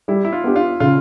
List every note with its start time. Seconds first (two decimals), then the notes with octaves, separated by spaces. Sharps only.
0.08 G3 E4
0.25 E4
0.33 F4
0.44 B3 D4 G4
0.56 F4
0.80 C#3 F4